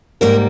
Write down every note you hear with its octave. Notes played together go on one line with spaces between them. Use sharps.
G#2 G3 A#3 A#4